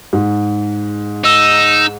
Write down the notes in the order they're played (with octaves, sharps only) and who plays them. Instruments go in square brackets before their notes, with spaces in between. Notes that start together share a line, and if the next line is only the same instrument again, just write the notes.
[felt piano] G#2
[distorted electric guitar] D#4 [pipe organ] E6